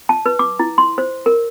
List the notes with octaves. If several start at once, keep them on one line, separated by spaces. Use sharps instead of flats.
A5
B4
D6
E4
C6
C5
A#4